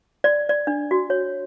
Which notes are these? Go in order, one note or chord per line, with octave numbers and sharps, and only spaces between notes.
D5
D5
D4
F#4
C#5